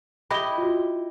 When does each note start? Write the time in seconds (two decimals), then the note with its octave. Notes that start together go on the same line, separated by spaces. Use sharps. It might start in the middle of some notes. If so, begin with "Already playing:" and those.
0.31 E4 G4 D#5 B5 G7
0.58 F4 F#4